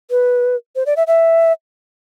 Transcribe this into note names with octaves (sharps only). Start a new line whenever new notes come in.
B4
C5
D5
E5
E5